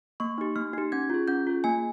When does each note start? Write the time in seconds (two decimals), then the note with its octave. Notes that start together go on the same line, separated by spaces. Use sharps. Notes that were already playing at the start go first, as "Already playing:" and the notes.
0.20 A#3 C#6
0.38 D#4 G4
0.56 A#3 F6
0.73 D#4 G4
0.92 C#4 G#6
1.10 F4 G#4
1.28 C#4 G6
1.47 F4 G#4
1.64 A#3 G#5